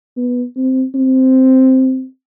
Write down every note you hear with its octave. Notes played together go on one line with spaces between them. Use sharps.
B3
C4
C4